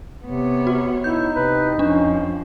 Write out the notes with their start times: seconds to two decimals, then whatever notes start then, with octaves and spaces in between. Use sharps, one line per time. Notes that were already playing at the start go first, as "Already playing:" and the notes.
0.25 C3 B3 C#5
0.67 F#4
1.04 D#4 E4 G6
1.36 C3 B4
1.79 F2 F3 C#4 D4